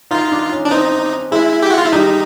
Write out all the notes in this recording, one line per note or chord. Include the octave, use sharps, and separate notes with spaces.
D#4 F4
D4
C#4
D4
C4 D#4
G#3 E4
G4
F#4
F4
E4
G3 D#4